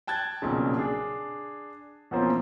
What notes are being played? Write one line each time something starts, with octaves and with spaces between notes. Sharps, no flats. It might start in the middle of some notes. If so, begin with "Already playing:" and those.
G5 A5 F#6 G#6 A6
B1 F2 A#2 C#3
D4 G#4
E2 B2 F3 A#3 C4 C#4